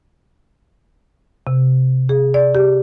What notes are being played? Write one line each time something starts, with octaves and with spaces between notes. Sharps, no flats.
C3
G#4
D5
G4